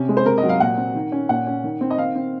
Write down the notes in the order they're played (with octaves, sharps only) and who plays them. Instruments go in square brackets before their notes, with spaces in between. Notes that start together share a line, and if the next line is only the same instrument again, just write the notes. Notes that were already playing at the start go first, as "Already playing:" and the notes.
Already playing: [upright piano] C3 C#4
G#3
C5
C3 A#4
D#5
F#3
F5
A#2 F#5
C4
D#3
C#4
A#2 F#5
C#4
D#3
C4
D#5
D#3 F5
C4